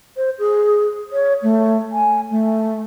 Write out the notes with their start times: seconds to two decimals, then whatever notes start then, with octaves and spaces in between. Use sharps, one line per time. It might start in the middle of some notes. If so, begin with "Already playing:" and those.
0.17 C5
0.39 G#4
1.12 C#5
1.43 A3
1.92 G#5
2.31 A3